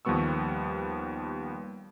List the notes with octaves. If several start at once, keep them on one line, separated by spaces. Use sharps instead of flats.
D#2 F3 G3 B3 C#6 E6